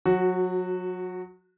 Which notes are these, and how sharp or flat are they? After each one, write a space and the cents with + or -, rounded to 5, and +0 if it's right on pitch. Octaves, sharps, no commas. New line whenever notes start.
F#3 -30 F#4 +0